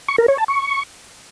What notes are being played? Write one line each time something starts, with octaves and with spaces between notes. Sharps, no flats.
C#6
A#4
C#5
A5
C#6